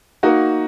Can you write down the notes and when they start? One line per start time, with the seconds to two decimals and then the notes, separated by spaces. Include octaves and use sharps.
0.23 A#3 D#4 F#4